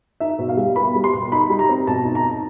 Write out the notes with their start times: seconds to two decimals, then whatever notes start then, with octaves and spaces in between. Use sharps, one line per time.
0.20 D#4 E5
0.39 B2
0.49 F5
0.57 G3
0.76 B3 B5
0.95 G3
1.04 C6
1.13 B2
1.32 D#4 B5
1.50 G3
1.59 A#5
1.69 C4
1.87 B2 A5
2.05 D#4
2.15 A#5
2.24 D#4